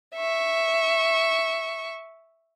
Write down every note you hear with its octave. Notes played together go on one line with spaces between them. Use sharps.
E5 C#6